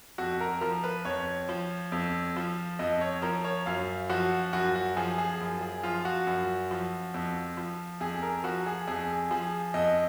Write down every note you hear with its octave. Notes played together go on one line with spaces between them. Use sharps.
F2 F#4
A#4
F3 A#4
B4
F2 C#5
F3
F2
F3
F2 D#5
C#5
F3 A#4
C#5
F#2 F5
F3 F#4
F#2 F#4
F#4
F3 G#4
G#4
F#2
G#4
F3 F4
F#4
F#2
F3
F2
F3
F2 G#4
A#4
F3 F#4
G#4
F2 G#4
F3 G#4
F2 D#5